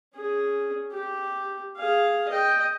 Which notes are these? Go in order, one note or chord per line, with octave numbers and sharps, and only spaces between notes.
C#4 G#4
G4
G#4 F5
D#5 G5